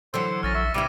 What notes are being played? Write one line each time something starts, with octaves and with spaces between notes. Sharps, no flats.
D3 E3 F#3 C5 E6 C#7
A#1 C#4 F6 A6 A#6
E5 C#6
C3 E3 G3 E4 D6 D#7